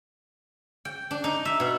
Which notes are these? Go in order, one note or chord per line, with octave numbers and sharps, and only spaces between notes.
G5
D4
D#4
E5
B2